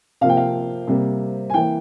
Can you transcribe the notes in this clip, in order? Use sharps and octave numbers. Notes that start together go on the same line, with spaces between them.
C3 F3 A#3 F5
G5
F5
C3 G3 A#3
G#5
E3 A#3 G5